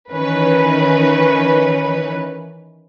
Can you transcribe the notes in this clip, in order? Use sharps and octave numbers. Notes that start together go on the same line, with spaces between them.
D#3 E3 C#4 B4